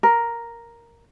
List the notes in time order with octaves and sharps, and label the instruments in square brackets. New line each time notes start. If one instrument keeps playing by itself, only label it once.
[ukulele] A#4